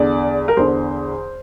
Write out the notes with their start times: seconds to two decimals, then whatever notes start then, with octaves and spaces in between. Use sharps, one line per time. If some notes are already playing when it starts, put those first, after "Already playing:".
Already playing: E2 D3 D5
0.48 A#4
0.57 E2 D3 C5